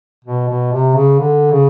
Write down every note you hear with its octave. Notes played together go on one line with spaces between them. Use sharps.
B2
B2
C3
C#3
D3
C#3